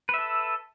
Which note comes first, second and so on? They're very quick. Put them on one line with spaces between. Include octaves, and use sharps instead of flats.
B4 E5 A4